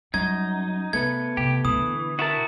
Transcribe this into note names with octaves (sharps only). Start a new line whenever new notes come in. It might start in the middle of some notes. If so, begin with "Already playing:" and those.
F#2 G3 D#4 G#6
C3 A3 B3 B4 G#6
C3 G4
B2 D3 E3 D#6
E4 F#4 A#4 E5 A5